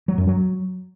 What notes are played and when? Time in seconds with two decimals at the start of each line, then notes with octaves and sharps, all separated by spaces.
0.08 F#3
0.18 F#2
0.27 F#3